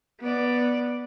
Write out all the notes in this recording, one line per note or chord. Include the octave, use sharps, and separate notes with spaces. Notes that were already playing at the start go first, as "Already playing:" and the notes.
B3 D5